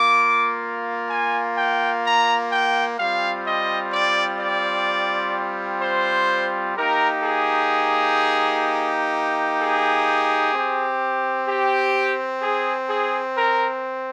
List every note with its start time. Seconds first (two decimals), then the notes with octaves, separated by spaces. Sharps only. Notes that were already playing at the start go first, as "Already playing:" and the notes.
Already playing: A#3 F4 D6
1.10 G#5
1.58 G5
2.05 A#5
2.52 G5
2.99 G3 C4 F4 F5
3.47 D#5
3.93 D5
4.41 D5
5.82 C5
6.76 A#3 D#4 G4 A#4
7.23 G#4
9.59 G#4
10.54 C4 G4
11.48 G4
12.42 G#4
12.89 G#4
13.36 A#4